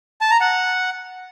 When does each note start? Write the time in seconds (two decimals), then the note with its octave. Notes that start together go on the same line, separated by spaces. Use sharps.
0.21 A5
0.31 A#5
0.41 F#5